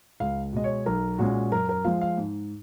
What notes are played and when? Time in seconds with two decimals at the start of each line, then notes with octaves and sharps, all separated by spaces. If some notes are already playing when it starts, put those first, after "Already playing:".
0.20 C#2 F5
0.53 B2 G#3 D#5
0.64 C#5
0.86 B1 A#4
1.19 A#2 G#3 C#4 F#4
1.52 F#2 A#4
1.69 A#4
1.85 F3 G#3 F5
2.01 F5
2.17 G#2